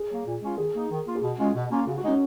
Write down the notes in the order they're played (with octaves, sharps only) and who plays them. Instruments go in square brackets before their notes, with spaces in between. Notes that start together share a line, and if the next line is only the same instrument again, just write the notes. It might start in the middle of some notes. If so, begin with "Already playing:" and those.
Already playing: [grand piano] G#4
[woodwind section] F#3 A#3
A#2
G#3 C#4 F4
[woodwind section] D#3 [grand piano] G#4
[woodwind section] A#3 D#4
D#3
A#3 F4
[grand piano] G#4
[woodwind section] B2 [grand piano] F#4
[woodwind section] G#3 C#4 F4
B2
A#3 C#4 F4
[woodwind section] C#3 [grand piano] F#4
[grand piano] F#4
[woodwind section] G#3 D#4 [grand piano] C#4